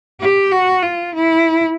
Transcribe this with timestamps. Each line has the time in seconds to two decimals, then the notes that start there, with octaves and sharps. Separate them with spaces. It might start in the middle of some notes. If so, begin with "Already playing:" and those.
0.21 G4
0.52 F#4
0.83 F4
1.15 E4